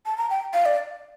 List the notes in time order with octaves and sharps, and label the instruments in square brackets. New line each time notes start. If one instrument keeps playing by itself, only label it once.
[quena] A5
A#5
G5
F5
D5